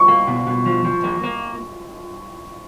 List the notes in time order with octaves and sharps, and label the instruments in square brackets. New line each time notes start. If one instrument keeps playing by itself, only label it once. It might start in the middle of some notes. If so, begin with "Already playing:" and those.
Already playing: [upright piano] C#6
[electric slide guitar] A#3
B2
B2
F3
F3
A#3
A#3